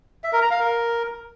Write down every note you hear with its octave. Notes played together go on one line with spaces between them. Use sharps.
E5
A#4
A#5
F5
A#4